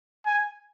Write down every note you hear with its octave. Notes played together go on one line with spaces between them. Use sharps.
G#5